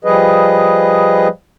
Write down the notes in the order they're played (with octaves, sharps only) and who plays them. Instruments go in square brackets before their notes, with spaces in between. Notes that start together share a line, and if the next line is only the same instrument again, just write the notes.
[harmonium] F3 G3 G#4 B4 D#5